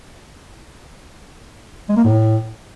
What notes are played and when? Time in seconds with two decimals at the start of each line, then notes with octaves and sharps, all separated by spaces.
1.89 G#3
1.97 A#3
2.04 A2